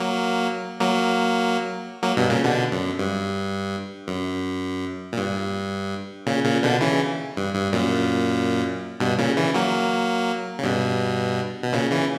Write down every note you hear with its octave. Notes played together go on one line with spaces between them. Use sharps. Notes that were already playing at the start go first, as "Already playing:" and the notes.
Already playing: F#3 A#3
F#3 A#3
F#3 A#3
G2 B2
A#2 C#3
B2 D3
F#2
G2
F#2
A#2
G2
A#2 C#3
A#2 C#3
B2 D3
C#3 E3
G2
G2
F#2 A#2
G2 B2
A#2 C#3
C#3 E3
F#3 A#3
C#3
G2 B2
B2
A#2 C#3
C#3 E3